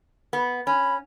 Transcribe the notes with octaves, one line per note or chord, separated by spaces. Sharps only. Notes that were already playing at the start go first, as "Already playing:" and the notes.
B3
C#4 B5